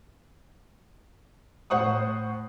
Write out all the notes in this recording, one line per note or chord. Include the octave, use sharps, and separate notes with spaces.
A2 C5 F#5 C#6 D#6